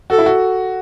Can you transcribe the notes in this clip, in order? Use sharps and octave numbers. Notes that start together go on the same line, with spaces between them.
F#4 A4
E4
F#4